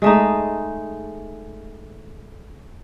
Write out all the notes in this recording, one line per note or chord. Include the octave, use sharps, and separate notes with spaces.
G#3 A3 D#4